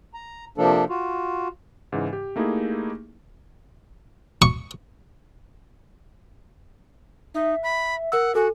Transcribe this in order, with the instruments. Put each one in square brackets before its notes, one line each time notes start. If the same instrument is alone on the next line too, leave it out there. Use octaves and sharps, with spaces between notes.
[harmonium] A#5
C3 F3 A#3 D4 A4
F4 F#4
[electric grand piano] G#2 C#3 E3
G4
A3 A#3 D#4 E4 G4 G#4
[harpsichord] C#6
[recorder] D#4 [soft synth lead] E5
[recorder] B5
[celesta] A#4 E6 [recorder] F#5
[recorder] F#4 [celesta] A4 [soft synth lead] G#5